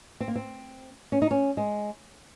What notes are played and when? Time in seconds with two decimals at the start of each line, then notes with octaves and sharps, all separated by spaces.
0.20 C4
0.28 A#3
0.36 C4
1.12 C#4
1.22 D#4
1.31 C#4
1.57 G#3